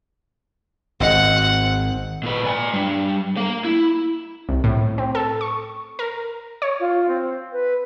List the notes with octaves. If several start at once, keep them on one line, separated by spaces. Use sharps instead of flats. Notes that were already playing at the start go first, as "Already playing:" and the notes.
G#1 C4 D#5 F#5
A#2 B4
D5 G#5
G3 D4
A#3 F5
E4
C2
A2
C4
A4
C#6
A#4
C#5
F4
C4
B4